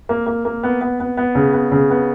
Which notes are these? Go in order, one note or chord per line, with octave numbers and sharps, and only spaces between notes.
A#3
A#3
A#3
B3
B3
B3
B3
C#3
B3
C#3
B3